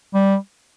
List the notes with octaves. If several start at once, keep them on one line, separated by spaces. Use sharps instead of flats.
G3